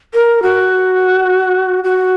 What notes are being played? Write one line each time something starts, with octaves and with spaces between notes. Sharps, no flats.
A#4
F#4
F#4